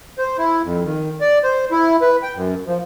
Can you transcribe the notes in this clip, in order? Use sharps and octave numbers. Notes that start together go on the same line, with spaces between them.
C5
E4
F2
D#3
D5
C5
E4
B4
G5
F#2
F3